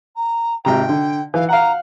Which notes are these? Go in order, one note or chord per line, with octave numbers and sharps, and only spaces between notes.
A#5
G#1 C3 G5 A#5
D3
E3 F5
F5 F#5 A#5